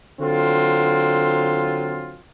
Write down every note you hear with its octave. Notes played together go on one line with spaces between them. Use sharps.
D3 F#3 C4 F4